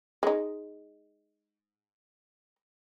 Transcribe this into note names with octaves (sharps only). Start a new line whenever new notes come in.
G#3 D#4